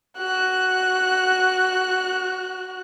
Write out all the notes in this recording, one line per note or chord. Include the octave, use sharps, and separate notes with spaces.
F#4 F#6